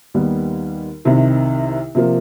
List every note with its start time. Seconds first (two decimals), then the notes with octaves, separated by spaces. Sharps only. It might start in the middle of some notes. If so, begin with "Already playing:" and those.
0.14 D#2 D#3 G3 B3
1.05 C2 C3 D#3
1.95 C3 F3 A#3